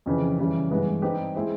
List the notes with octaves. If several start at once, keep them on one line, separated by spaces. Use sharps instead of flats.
F2 C#3 E3
C#3 E3 G3
G2 E3 G#3 B3
G3 C4 D#4 G4 B4
G#3 C4 E4 G#4 C5